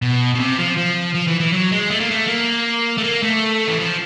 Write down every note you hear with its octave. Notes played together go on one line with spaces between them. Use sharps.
B2
B2
C3
F3
F3
F3
E3
E3
F#3
G#3
A3
A#3
A3
A#3
A3
A#3
A3
E3
F3